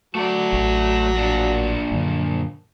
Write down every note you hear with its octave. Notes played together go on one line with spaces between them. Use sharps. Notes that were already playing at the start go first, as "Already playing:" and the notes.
F#3 A3 D5
A1
A#2 D4
F#2 D3